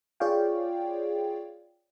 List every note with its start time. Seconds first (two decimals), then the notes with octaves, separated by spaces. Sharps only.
0.20 F4 G#4 C#5 D5 F5 G5